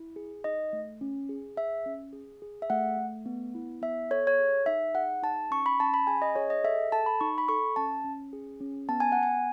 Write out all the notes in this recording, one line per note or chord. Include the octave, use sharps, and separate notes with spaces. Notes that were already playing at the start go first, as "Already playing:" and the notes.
Already playing: E4
G#4
D#4 D#5
A3
C#4
G#4
G#4 E5
C#4
G#4
G#4
E5
A3 F#5
A3
B3
E4
B3 E5
A4 C#5
C#5
G#4
D#4 E5
G#4 F#5
D#4 A5
C#4 C#6
B5
C#4 A5
B5
G#4 G#5
D#5
G#4 C#5
D#5
A4 E5
A4 A5
B5
D#4 C#6
B5
A4 C#6
C#4 A5
C#4
G#4
C#4
B3 A5
G#5
F#5
B3
G#5